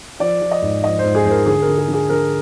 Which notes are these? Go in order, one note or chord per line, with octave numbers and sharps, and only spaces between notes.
F3 D5
F3
D#5
G#2
F3 D#5
G#2 C5
G#4
G#2 C5
A#4
D3 G#4
A#4
D3
G#4
D3
G#4
D3 A#4